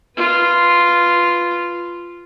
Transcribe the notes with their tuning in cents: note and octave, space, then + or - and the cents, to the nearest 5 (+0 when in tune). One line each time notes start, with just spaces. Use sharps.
F4 -5 B4 +0